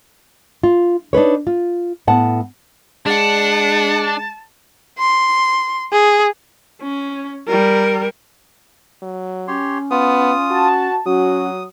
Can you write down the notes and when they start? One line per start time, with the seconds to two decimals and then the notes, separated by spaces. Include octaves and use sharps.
0.63 F4
1.13 D4 D#4 B4 C#5
1.47 F4
2.07 A2 B3 F#5 A5
3.06 G#3 D4 F#5 A5
4.99 C6
5.93 G#4
6.82 C#4
7.48 G3 A#4
9.02 F#3
9.48 C#4 G4 C#5 C6
9.91 B3 F4 D#6
10.50 F#4 A5
11.06 F#3 C#4 F#4 D#6